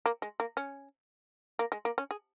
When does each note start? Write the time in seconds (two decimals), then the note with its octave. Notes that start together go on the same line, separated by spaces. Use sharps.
0.06 A#3
0.22 G#3
0.40 A#3
0.57 C#4
1.59 A#3
1.72 G#3
1.85 A#3
1.98 C#4
2.11 G#4